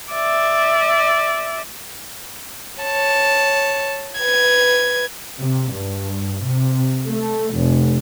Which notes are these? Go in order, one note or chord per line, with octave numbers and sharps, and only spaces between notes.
D5 E5
C#5 A5
B4 G#6
C3
G2
C3
A3
F1